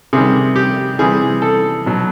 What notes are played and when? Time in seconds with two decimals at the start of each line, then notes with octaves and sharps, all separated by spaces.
0.13 C3 D#3 G3 G#4
0.56 G4
0.99 C3 E3 G3 G#4
1.42 A4
1.86 B2 F#3